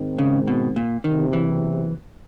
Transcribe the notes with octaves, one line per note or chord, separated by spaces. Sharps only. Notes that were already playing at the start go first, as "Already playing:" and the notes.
Already playing: G#2 D#3 G#3 C4
C#3
B2
A#2
F#1 E2 C3 D#3
E3